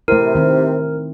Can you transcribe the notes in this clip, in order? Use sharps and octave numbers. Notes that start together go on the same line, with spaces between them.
C3 A3 E4 A#4
D#3 C4